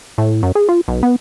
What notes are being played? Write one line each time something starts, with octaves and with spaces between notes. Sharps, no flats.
A2
F#2
G#4
F4
B1
B3